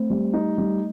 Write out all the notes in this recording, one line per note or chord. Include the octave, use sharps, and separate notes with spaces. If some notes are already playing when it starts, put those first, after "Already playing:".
Already playing: A3 C4
G3
D#4
G3